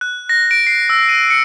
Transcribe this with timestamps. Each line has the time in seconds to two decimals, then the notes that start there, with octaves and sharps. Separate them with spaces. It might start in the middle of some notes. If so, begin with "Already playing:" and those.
0.01 F#6
0.29 A#6
0.51 D7
0.67 C7
0.89 E6
1.09 D#7
1.30 C#7